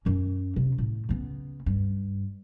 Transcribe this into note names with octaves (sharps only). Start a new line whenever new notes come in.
F#2 C#4
C3
A2
C#3 B3
G2